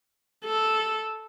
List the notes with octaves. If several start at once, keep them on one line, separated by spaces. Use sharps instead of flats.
A4